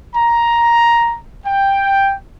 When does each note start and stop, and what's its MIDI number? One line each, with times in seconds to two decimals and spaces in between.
0.15 1.18 82
1.46 2.14 79